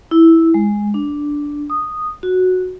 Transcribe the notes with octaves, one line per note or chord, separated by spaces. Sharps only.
E4
G#3
D4
D#6
F#4